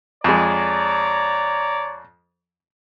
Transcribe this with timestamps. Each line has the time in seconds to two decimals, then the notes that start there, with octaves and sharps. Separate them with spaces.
0.24 F2 G#3 C#5 D5 A#5